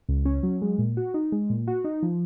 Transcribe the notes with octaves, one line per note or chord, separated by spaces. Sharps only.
C#2
C#4
F#3
G#3
A#2
F#4
D#4
G#3
A#2
F#4
D#4
F3